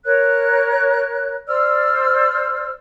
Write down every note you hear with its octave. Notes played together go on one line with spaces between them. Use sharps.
A#4 C#5 F#6
C5 D5 E6 F6